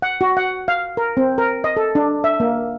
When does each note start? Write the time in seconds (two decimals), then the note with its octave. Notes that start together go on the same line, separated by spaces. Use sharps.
0.02 F#5
0.21 F#4
0.37 F#5
0.68 F5
0.97 A#4
1.17 C4
1.38 A#4
1.64 D#5
1.77 A4
1.95 D4
2.24 E5
2.40 A#3